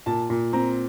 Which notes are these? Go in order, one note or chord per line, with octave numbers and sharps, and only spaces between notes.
A#2 A5
A#2
C4 A#5